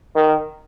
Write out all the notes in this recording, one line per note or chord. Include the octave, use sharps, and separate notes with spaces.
D#3